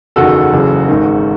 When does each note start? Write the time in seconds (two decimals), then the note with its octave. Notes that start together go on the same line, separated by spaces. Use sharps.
0.16 F#1 E2 D#3 F#4 A4
0.53 F#1 F#2 C#3 E3
0.88 G#1 G#2 D#3